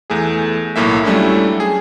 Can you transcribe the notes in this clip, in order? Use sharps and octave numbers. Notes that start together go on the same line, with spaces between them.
E2 A3 G#4
B1 A2 A#3 E5
F#3 G3 A3 C#4 D4 E4
G#4